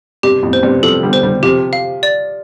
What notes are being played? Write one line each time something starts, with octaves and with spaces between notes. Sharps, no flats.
G2 C3 G4
F2 A2
C5
G2 C3
C3 F3 A4
D3 G3
C5
D3 G3
C3 F3 G4
F5
D5